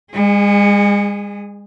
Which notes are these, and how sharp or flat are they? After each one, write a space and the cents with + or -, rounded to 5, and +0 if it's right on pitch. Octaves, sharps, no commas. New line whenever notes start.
G#3 -40 G#4 -10